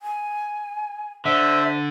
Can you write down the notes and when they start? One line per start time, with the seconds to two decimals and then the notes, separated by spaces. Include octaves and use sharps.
0.02 G#5
1.25 D3 C5 E5